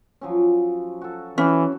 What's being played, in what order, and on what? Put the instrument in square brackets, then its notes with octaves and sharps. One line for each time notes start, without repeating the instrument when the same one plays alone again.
[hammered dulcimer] F3 F#3 C#4
F#4 A4
[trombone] E3 [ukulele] C#4 [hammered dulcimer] F#4